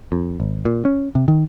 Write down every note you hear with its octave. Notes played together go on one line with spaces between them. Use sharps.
F2
G#1
A#2
C#4
C3
D#3